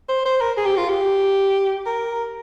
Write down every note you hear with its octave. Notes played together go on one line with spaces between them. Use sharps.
C5
C5
A#4
G#4
G4
F4
G4
A#4